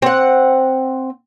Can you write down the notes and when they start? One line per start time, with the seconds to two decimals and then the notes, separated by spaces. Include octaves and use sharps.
0.02 C4 F#5